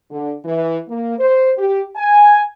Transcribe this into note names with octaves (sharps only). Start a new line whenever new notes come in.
D3
E3
A#3
C5
G4
G#5